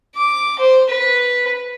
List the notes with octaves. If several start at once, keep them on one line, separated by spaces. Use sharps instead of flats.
D6
C5
B4